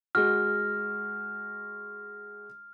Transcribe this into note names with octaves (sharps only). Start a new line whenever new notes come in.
G#3 F#4 F6